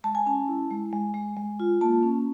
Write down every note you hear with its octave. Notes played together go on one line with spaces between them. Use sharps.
G#3 A5
G#5
C#4 A5
E4
G#3
G#3
G#3
G#3
F4
A#3 A5
C#4